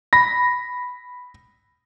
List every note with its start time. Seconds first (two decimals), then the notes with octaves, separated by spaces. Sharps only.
0.13 B5 A#6